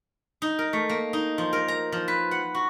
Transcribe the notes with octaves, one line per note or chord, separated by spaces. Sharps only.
D#4
A#4
A3
A#3
D#4
F3
A#4
A#5
F3
B4
F#5
F#4